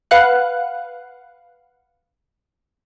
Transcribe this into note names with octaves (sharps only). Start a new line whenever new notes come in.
B4 F5 F#5 F#6